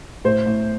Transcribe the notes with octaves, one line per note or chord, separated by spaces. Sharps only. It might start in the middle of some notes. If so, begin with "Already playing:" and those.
A2 C5
A2